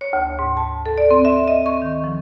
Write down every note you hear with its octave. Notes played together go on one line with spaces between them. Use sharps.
C#5
D2
G#2
A5
A4
D5
C4
E5
D#5
C#6
D#3
F3